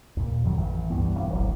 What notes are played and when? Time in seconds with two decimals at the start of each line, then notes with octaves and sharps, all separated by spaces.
0.17 D#2 A#2
0.44 F2 D#3 F#3
0.57 A1 E3
0.90 C#2 G2 E3 B3
1.16 E1
1.29 D1 G#1 F#3